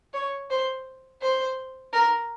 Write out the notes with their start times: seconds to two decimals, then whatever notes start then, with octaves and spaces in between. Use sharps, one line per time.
0.13 C#5
0.50 C5
1.21 C5
1.93 A#4